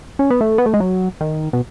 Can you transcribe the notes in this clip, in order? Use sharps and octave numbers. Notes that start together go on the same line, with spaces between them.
C#4
B3
A3
B3
A3
G#3
F#3
D#3
B2